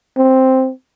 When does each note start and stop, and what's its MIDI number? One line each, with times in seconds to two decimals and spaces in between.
0.18 0.71 60